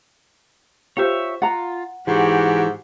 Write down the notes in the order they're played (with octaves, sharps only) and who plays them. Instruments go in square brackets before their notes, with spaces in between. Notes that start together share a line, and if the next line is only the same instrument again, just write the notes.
[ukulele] F4 G4 C5 [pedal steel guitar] C#5 E5
[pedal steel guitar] F4 [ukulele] F#5 A#5
[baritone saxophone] G#2 [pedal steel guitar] E3 [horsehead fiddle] F#4 G4